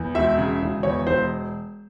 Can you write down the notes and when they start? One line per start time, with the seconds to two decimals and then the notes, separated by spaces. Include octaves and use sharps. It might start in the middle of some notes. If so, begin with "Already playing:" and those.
Already playing: E2
0.15 E1 E5
0.38 C#3
0.61 E1
0.83 E2 C#5
1.07 E1 C5